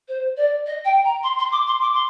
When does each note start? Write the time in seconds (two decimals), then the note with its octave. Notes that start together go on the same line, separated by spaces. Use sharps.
0.08 C5
0.37 D5
0.66 D#5
0.85 G5
1.04 A#5
1.23 C6
1.38 C6
1.52 D6
1.67 C6
1.81 D6
1.94 C6